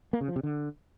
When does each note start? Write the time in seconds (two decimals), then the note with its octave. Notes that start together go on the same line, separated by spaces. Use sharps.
0.13 A#3
0.21 C#3
0.28 F3
0.36 C3
0.43 D3